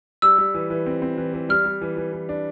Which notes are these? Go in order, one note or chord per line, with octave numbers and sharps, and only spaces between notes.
G3 E6
G3
E3
E3
C4
C4
E3
E3
G3 F6
G3
E3
E3
E3
D4